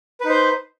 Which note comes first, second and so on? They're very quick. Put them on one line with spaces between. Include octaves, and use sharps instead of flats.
B4 D#4 C5